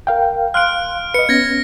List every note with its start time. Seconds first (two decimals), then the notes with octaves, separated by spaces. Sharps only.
0.07 A#4 F5 G5
0.54 F5 C6 F6 F#6 D7
1.14 B4 D#5 C#7
1.29 B3 C#4 G#6 A#6